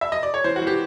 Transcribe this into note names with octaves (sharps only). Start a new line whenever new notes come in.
E5
D#5
D5
C#5
E3 C5
F#4
E3
G4